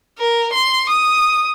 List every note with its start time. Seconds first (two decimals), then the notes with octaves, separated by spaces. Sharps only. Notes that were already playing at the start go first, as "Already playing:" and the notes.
0.18 A#4
0.52 C6
0.90 D#6